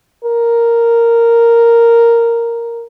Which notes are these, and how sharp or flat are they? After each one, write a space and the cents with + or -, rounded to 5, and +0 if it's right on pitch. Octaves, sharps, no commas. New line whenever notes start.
A#4 -5